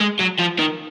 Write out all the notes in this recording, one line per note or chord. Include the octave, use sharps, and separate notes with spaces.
G#3
F#3
F3
D#3